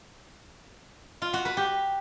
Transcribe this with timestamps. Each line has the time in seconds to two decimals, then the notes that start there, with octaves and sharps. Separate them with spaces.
1.22 F4
1.33 F#4
1.45 B4
1.57 G4